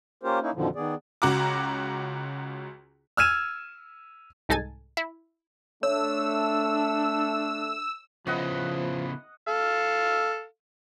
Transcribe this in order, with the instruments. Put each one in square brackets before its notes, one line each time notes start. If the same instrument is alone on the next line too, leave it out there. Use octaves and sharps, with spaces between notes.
[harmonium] A#3 C#4 F4 G4 A#4 C5
A#3 C#4 D#4 E4
F#2 B2 D3 D#3 F3
D#3 B3 G#4 D5
[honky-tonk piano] C#2 F#4 A#5 D6
[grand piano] E6 F6 G#6 D#7 E7
[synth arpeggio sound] C2 G#2 D#4 A4 G#5 A6
E4
[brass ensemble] A3 [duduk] D4 [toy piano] C#5 [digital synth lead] E6
[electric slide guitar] C#3 B3 E4 [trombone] F3 [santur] D#5 F#5
[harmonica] A4 F5